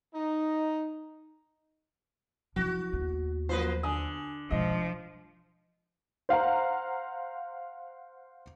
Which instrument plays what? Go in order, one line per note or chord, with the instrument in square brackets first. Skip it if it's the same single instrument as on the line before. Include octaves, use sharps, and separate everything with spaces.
[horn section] D#4
[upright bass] F3 E4 [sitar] F#4
[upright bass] D#2 B3
[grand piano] F3 F#3 [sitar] A#3 B4 C5
[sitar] D3 [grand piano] G#5 D#6
[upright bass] B2 G#3 [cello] F3 [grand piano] D#5
[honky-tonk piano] C5 F5 F#5 A#5